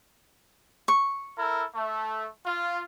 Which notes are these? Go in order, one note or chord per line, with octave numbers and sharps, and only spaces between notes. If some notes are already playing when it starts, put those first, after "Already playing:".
C#6
E4 A4 A#4
A3
F4